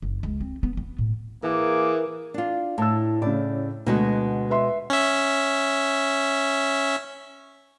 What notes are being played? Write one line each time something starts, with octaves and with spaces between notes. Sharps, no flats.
F#1
C#2
C4
B3
B3
A2
E3 A#3 G#4 A#4 D6
D4 F4
A2 A5 E6
A2 C#3 D5
D2 B2 G#3 F#4
B4 E5 C6
C#4 E5